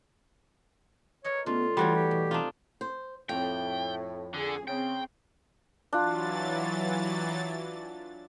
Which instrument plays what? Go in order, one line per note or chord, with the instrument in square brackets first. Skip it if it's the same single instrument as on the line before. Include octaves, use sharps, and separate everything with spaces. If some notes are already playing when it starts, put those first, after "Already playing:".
[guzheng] A#4 B4 D#5 [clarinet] C#5
[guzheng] C#3 A3 D4 [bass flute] B3 [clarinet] F4
[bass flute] E3 [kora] G3 F#4 C#5 [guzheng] A3 D4 A#4
[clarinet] G4
[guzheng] B2
[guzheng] C3 [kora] D4 D#4 F4
[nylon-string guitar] C5
[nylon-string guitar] F2 [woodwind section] A2 [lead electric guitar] G5
[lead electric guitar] D3 [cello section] G#4
[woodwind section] C#3 [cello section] C4 [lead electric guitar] G5
[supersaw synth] E3 F#3 A6 [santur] D4 F4